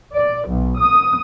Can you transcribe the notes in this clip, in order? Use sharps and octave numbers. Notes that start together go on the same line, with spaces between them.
D5
B1
D#6